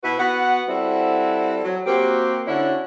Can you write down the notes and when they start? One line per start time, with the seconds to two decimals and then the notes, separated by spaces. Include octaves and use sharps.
0.04 B2 E4 F#4 B4
0.19 B3 F#4 B4 F#5
0.68 G3 C4 E4 F#4 A4
1.64 F#3
1.86 A#3 C4 F#4 G4
2.48 D3 C#4 D4 E4 F#4